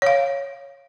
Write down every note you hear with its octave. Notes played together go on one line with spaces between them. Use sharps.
C#5 F5